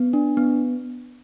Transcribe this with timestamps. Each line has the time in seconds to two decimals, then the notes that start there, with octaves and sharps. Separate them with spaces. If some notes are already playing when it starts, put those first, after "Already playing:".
Already playing: B3
0.13 D4
0.37 B3